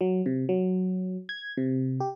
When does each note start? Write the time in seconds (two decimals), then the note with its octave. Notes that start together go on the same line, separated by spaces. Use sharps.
0.01 F#3
0.26 C3
0.49 F#3
1.29 G#6
1.57 C3
2.00 G4